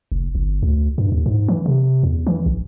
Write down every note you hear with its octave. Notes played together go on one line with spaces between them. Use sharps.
F1
G1
D2
G2
D#2
G#2
E3
C3
E2
E3
A#1